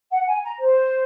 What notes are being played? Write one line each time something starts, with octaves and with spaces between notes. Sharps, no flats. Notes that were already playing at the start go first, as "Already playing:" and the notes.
F#5
G#5
A#5
C5